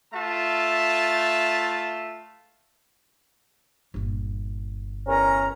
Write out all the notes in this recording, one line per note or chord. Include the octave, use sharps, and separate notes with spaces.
A3 F4 E5 A5
G1 A#2
E2 C#4 A#4 A#5